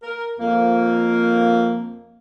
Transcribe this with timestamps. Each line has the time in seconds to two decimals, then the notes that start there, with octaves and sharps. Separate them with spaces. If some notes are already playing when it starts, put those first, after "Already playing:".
0.03 A#4
0.38 F2 A#3